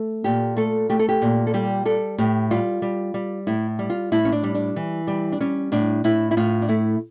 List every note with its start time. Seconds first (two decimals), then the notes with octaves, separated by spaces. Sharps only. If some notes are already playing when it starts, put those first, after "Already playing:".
Already playing: A3
0.24 A#2 G4
0.57 A3 A4
0.90 A3 G4
0.99 A4
1.09 G4
1.22 A#2
1.47 A4
1.54 G3 G4
1.85 G3 A4
2.18 A2 G4
2.51 G3 F4
2.82 G3
3.14 G3
3.47 A2 E4
3.79 G3
3.90 F4
4.12 A2 E4
4.25 C#4
4.32 D4
4.43 G3
4.55 D4
4.76 E3
5.07 G3
5.32 D4
5.40 G3 C#4
5.72 A2 D4
6.04 A2 E4
6.31 E4
6.37 A2 F4
6.62 D4
6.69 A3 E4